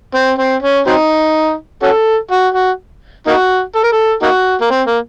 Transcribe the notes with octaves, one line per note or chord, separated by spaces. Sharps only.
C4
C4
C#4
F#3 C4 D#4
C#4 F#4 A4
F#4
F#4
A#3 D#4 F#4
A4
A#4
A4
A#3 D#4 F#4
A#3
C4
A#3